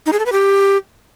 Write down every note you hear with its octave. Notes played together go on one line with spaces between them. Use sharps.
D#4
G#4
A4
B4
G4